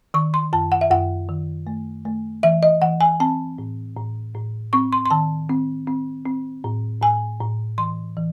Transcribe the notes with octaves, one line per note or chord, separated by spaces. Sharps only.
D#3 C#6
C6
F#2 A5
F#5
E5
F#2 F#5
D#3
A3
A3
E3 E5
D#5
E3 F#5
G#5
C4 A5
A2
A2
A2
C4 C#6
C6
C6
D#3 A5
C4
C4
C4
A2
A2 G#5
A2
E3 C6
E3